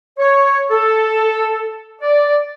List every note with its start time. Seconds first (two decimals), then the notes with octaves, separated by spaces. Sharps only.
0.19 C#5
0.71 A4
2.00 D5